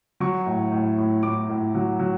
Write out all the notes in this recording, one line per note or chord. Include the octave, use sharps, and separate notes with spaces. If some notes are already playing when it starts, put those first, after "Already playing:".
F#3 C#6
A2
A2
A2
A2 D6
A2
F#3
F#3